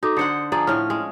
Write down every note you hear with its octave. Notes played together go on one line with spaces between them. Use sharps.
D#4 F#4 A4 D6
D3 C5 F#5 D#6 C#7
F3 G#4 D5 A#5
A2 C#4 F6
G#3